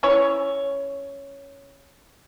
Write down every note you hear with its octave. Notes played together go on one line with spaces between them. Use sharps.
C#4 E4 C#5